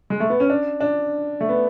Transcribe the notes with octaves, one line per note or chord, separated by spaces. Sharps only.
G#3
A3
B3
C#4
D4
D4
A3
B3